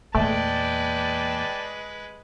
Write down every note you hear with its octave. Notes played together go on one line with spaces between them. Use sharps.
E2 A#2 G#3 A3 B4 D5 G5 A5